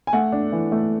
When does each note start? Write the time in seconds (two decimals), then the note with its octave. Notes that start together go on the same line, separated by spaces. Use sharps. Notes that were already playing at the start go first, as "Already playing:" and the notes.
0.07 G#5
0.13 A3 F#5
0.32 D4
0.52 E3
0.72 A3